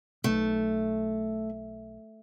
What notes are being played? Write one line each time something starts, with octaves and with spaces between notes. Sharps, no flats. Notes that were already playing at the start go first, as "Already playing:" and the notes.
B1 B2 A3